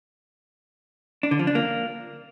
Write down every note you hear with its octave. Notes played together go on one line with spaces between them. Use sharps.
D4
D3
F3
D4
A#3